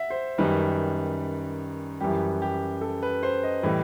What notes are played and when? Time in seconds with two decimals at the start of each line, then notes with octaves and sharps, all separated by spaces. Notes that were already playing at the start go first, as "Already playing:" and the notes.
Already playing: E5 F#5
0.10 C5
0.38 F#2 D#3 G3 B4
2.00 F#2 E3 G3 G4
2.42 G4
2.81 A4
3.03 B4
3.23 C5
3.43 D#5
3.63 A2 E3 G3